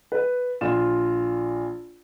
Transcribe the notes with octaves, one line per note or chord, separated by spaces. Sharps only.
B4
A#1 F4 E7